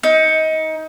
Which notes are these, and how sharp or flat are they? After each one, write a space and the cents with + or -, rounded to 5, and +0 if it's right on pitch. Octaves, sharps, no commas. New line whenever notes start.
D#4 +25